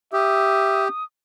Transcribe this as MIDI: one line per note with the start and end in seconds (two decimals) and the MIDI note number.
0.13 0.88 67
0.13 0.85 76
0.13 1.04 87